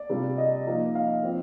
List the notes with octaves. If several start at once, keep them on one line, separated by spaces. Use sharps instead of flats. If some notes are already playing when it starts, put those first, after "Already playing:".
Already playing: D5
C3 G3 D4 F4
D#5
F3 A#3 D#4
F5
F3 C4 F4